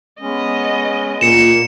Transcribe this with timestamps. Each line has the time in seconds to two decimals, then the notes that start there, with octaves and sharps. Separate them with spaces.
0.21 G#3 B3 C#4 D#5
1.21 A#2 A#3 C#7 E7